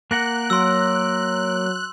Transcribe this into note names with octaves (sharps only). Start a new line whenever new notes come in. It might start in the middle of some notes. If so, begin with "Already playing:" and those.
A#3 A#4 F#5 F#6
F#3 C6 E6